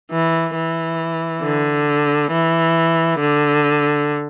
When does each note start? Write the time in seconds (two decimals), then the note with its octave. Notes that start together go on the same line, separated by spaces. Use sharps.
0.11 E3
0.55 E3
1.43 D3
2.32 E3
3.20 D3